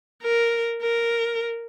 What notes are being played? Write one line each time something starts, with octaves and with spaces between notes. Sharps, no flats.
A#4
A#4